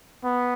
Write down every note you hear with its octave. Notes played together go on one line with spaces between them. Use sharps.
B3